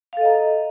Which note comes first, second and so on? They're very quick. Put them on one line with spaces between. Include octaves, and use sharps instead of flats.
F5 A4 D#5 A#5